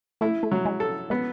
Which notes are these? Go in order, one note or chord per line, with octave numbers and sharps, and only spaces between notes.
A3 E4
A3
F#3
G#3
A4
G#3 B3